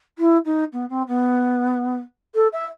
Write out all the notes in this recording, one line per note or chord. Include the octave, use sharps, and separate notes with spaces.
E4
D#4
B3
C4
B3
A4
E5